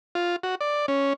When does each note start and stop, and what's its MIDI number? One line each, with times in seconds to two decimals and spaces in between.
0.15 0.36 65
0.43 0.55 66
0.61 0.86 74
0.88 1.13 61